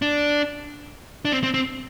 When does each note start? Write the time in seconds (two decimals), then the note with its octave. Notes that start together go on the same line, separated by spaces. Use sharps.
0.02 D4
1.25 D4
1.32 C4
1.43 C4
1.54 C4